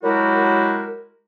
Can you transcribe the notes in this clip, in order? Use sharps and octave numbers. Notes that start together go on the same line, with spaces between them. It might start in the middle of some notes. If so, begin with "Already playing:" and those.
F#3 G#3 E4 F#4 G4 A#4